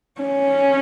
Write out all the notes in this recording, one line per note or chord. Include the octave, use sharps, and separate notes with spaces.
C#4